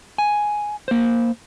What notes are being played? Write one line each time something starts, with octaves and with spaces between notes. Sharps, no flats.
G#5
A#3 C5